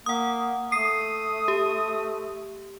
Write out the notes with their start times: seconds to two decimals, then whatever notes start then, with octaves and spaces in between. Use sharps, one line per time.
0.06 A#3 F#5 D#6
0.72 A3 D#6 C7
1.48 G4